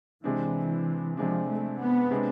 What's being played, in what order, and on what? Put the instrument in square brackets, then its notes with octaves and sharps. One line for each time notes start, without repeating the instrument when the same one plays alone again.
[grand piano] C3 G#3 D4 [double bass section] E3
[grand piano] C3 G#3 D4 [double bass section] F3
[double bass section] A3
B3
[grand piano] C3 G#3 D4